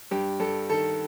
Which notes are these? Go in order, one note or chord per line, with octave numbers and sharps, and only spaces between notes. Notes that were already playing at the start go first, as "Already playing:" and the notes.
G2 G4
G2 A4
D#3 A4